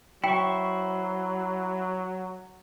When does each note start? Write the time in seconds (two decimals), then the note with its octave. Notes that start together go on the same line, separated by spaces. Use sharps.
0.24 F#3 E4 C5 G5 C#6